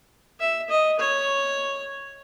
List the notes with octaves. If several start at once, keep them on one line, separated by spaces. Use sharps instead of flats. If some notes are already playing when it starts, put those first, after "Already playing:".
E5
D#5
C#5